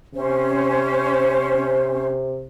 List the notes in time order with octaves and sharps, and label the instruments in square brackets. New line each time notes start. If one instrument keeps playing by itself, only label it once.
[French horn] C3 [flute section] C#4 C5